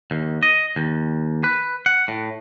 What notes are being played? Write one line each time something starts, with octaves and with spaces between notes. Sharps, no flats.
D#2
D#5
D#2
B4
F#5
A2